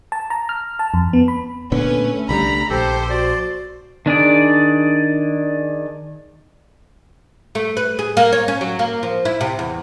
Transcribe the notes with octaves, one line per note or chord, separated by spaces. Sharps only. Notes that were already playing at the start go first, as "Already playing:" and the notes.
A5
A#5
F6
A5
F2
B3
B5
A#2 D3 A3 B3 C#4 B4
C2 D3 G3 A#5 B5
A#1 G4 A4 C5
F#4 D5
D#3 D4 G#4 D5
A3
B4
G#4
A#3
C#5
C#4
F#3
A#3
F3
E4
C3
E2